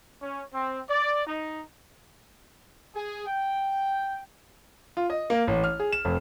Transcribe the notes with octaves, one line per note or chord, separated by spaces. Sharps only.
C#4
C4
D5
D#4
G#4
G5
F4
D#5
A#3
A1
F6
G#4
E7
F1